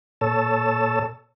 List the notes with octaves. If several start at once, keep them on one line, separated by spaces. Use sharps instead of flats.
A#2 A4 C#5 A5 E6